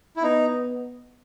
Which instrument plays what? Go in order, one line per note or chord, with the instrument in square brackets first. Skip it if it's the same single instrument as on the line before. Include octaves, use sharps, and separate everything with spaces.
[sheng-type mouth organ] E4
[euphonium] B3 [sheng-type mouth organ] D#4